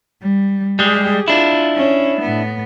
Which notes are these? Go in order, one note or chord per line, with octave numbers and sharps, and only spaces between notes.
G3
G3 G#3 G4 G#4
D4 E4 F4
C#4
A2 B3